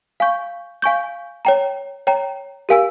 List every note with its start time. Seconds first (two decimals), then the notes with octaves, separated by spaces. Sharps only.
0.20 F5 G#5 C#6 G6
0.82 F5 G#5 C#6 G6
1.45 C#5 G5 A#5
2.07 C#5 G5 A#5
2.69 G4 A#4 F5 G#5 E6